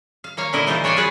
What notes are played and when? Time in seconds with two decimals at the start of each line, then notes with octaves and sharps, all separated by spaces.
0.24 F5
0.37 A#3 C#5 F5
0.53 A#2 D3 E4 A#4 D#5
0.67 C#3 E3 D#4 F4 A#4 C5
0.84 D4 C#5 D5 G5 G#5
0.96 F4 F#4 G#4 B4 F#5